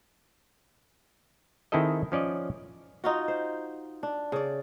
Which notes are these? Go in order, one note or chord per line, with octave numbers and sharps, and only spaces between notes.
D#3 C4 E4 G#4 A4 D#5
F3 C#4 D5 D#5
D#4 F4 F#4
C5
D4
C#3 D5